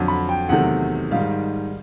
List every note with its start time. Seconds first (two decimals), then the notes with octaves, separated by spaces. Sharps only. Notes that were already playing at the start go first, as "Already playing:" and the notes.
Already playing: F2 D3 F#3
0.08 B5
0.29 G5
0.49 E2 C3 D#3 F#3 A3 F#5
1.11 G#2 D#3 G3 F5